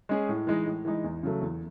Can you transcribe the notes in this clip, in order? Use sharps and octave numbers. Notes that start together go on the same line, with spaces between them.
G#3 C#4 G#4
A2
E3 G#3 D#4
A2
E3 G#3 D#4
E2
C#3 F#3 A3
E2